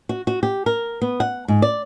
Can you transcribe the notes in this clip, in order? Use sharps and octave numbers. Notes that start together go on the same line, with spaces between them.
F#4
F#4
G4
A#4
B3
F#5
G#2
D5